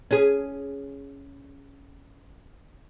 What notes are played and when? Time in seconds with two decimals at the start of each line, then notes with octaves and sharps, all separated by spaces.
0.11 C#4 G#4